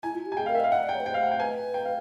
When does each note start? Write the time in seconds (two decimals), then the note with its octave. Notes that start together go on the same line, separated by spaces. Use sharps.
0.03 E4 G#5
0.15 F4
0.26 G4
0.32 G#5
0.37 G#4 G5
0.46 A#4 F5
0.55 E5
0.60 D#5
0.64 F5
0.71 D#5 F#5
0.83 D5
0.89 G5
0.95 C#5
1.00 B4
1.06 C5 G5
1.14 F5
1.23 F#5
1.31 G5
1.40 B4 G#5
1.74 G5
1.85 F5